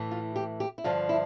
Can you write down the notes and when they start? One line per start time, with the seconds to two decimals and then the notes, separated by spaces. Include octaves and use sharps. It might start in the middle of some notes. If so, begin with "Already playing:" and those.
Already playing: A2 E3
0.11 F4
0.36 G4
0.60 G4
0.78 E4
0.84 G2 D3 F3 F4
1.09 E4